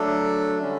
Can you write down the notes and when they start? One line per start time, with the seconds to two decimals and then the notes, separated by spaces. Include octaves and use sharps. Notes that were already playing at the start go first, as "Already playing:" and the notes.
Already playing: F#3 A3 D4 A4
0.59 D3 G3 C#4